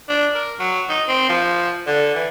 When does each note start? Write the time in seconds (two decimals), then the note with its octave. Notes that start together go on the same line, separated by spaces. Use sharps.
0.09 D4
0.35 A#4
0.60 F#3
0.89 D#4
1.08 C4
1.29 F3
1.87 D3
2.15 E3